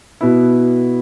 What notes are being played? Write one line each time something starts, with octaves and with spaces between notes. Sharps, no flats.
B2 B3 E4